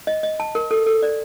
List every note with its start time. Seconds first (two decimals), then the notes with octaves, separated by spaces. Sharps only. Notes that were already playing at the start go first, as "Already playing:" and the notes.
0.07 D#5
0.23 D#5
0.40 A5
0.55 A#4
0.71 A4
0.86 A4
1.02 D5